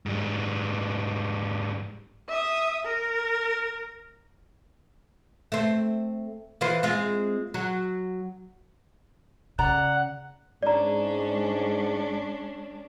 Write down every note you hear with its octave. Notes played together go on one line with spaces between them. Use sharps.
G#2 G3
E5 D#6
A#4
A3 C4
E3 F4 C5
G#3 C4 F4
F#3
C#3 D5 F#5 A#5
G#2 G#3 C#4 D4 D5 A#5